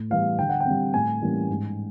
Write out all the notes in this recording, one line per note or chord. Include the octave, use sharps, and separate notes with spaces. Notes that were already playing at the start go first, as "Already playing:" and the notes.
Already playing: A2
E3 G3 B3 F5
D3 G5
F#5
G5
G3 C4
A2 G#5
E3 G3 A#3 C#4
G#2